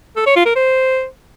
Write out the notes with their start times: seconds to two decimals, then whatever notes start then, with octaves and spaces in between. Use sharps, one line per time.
0.16 A4
0.26 C#5
0.36 F4
0.46 A#4
0.55 C5